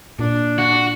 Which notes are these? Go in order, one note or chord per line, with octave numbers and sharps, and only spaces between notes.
A#2 D4
F#4